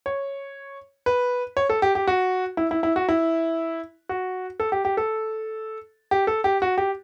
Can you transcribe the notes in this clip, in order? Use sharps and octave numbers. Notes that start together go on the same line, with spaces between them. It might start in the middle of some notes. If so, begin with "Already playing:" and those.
C#5
B4
C#5
A4
G4
G4
F#4
E4
E4
E4
F#4
E4
F#4
A4
G4
G4
A4
G4
A4
G4
F#4
G4